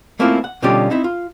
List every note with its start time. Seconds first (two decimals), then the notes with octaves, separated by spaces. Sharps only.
0.19 A3 A#3 C4 C#4 E4 F4
0.44 F#5
0.62 B2 D3 G3 C#4 F4 G4
0.90 C4 D#4 E4 E5
1.04 F4